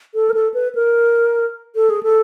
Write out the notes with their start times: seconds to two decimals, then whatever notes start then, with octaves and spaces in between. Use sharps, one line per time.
0.14 A4
0.30 A#4
0.34 A4
0.54 B4
0.75 A#4
1.76 A4
1.90 G#4
2.03 A4